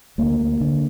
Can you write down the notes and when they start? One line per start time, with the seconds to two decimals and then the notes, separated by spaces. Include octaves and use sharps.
0.18 D2 A#3
0.40 D2
0.61 D3